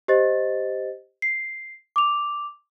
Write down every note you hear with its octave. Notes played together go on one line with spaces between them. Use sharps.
G4 C5 D#5 A6
C7
D6 F7